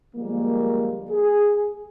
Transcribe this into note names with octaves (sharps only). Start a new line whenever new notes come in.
D3 F3 G3 G#3 A#3
G#4